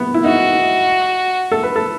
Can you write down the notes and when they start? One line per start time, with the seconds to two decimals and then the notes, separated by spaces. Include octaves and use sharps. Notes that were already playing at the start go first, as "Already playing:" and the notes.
Already playing: B3
0.14 E4
0.24 D#4 F#4
1.52 A4
1.63 B4
1.76 A4